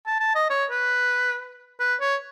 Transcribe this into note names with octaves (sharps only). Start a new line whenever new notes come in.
A5
A5
D#5
C#5
B4
B4
C#5